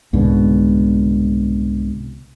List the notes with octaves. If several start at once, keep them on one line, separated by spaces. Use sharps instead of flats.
C2 G#2 B2 D3